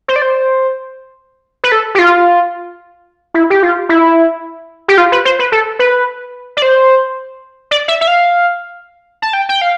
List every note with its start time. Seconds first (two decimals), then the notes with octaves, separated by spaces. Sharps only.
0.08 C5
0.16 D5
0.22 C5
1.64 B4
1.72 A4
1.95 G4
1.99 F4
3.34 E4
3.50 G4
3.63 F4
3.89 E4
4.88 G4
4.98 F4
5.12 B4
5.25 C5
5.39 B4
5.52 A4
5.79 B4
6.57 D5
6.62 C5
7.71 D5
7.88 E5
8.01 E5
8.07 F5
9.22 A5
9.33 G5
9.49 G5
9.62 F5